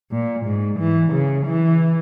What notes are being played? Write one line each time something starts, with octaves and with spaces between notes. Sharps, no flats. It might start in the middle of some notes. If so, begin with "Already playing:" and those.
A#2
G#2
E3
C#3
E3